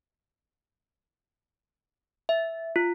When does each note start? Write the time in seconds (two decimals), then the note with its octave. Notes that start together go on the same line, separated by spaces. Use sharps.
2.29 E5
2.76 F4